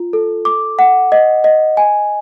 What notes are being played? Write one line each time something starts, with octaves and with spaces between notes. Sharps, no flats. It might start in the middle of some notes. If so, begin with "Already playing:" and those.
Already playing: F4
A4
D6
F#5
D#5
D#5
G#5